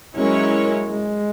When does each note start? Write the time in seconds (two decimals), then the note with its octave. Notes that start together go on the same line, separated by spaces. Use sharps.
0.17 F#3 G#3 C#4 E4 A#4 C#5
0.91 G#3